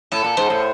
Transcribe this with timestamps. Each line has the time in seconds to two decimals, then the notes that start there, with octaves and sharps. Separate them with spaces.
0.12 A2 A4
0.24 A#2
0.37 G#2 C5
0.50 A2